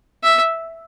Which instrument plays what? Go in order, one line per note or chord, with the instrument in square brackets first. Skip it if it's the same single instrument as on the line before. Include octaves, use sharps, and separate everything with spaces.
[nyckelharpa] E5